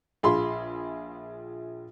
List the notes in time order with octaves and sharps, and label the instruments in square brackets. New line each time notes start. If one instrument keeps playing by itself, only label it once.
[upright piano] A#1 F4 G#4 B5 C6